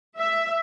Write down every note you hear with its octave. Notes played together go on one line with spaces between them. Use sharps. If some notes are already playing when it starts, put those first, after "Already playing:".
E5